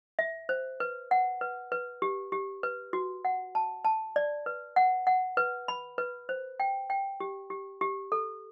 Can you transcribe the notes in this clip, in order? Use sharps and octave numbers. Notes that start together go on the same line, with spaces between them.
E5
C5
B4
F#5
B4
B4
G4
G4
B4
F#4
F#5
A5
A5
D5
B4
F#5
F#5
B4
B5
B4
C5
G5
G5
G4
G4
G4
A4